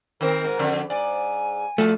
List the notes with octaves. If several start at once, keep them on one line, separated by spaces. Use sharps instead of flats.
D#3 C4 A#4
G#2
F2 D3
G#2 D5 G#5
F3 A3 F4